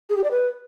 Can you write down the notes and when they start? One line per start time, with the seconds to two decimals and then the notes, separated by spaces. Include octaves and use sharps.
0.10 G#4
0.17 G4
0.24 D5
0.31 B4